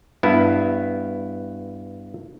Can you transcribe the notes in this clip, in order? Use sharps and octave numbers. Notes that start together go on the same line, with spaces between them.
G2 B3 E4